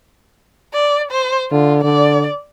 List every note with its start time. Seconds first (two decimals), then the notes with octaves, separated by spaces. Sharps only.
0.73 D5
1.11 C5
1.51 D3 F4
1.84 D3 D5